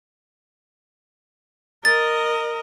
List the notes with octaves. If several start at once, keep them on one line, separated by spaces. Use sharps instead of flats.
A#4 D#5 A6